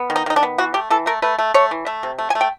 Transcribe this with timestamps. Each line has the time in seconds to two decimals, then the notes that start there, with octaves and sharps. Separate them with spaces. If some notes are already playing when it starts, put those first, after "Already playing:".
Already playing: B3
0.10 D#3
0.16 D#4
0.26 D#3 D#4
0.36 D4
0.43 B3
0.58 E3 F#4
0.74 A3 G4
0.90 E3 A4
1.06 A3 A#4
1.22 A3 B4
1.39 A3
1.54 A3 C#5
1.71 E3
1.86 A3 E5
2.03 C3
2.19 A3
2.30 G#5
2.35 A3
2.41 G5